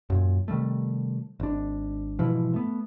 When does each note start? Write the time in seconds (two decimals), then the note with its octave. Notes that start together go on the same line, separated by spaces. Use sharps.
0.10 F#2 A#2
0.48 C3 D#3 G3 A3
1.40 G#1 D4
2.19 G#2 B2 E3 F3
2.54 A3 B3